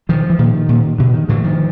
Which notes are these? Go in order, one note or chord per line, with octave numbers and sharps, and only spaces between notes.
B2 D#3 F3
E3
A#2 D#3
A#2
B2 D3
D#3
A2 D3 E3
D#3 F3